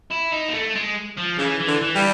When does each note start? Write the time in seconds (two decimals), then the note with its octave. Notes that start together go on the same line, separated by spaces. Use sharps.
0.11 E4
0.32 D#4
0.48 A#3
0.54 A3
0.75 G#3
1.18 F3
1.38 C#3 E3
1.60 E3
1.68 D3
1.82 E3
1.95 G3